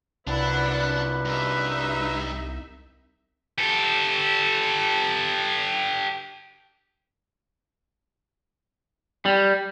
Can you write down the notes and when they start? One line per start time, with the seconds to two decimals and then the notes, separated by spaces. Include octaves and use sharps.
0.27 C2 F#2 A#2 D4 E4 B4 F#5 B5
1.25 G2 D#4 E5
3.58 G4 A4
9.25 G3